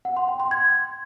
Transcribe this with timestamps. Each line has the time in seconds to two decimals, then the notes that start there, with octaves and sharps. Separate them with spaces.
0.05 F#5
0.17 C6
0.28 G5
0.40 C6
0.51 G#6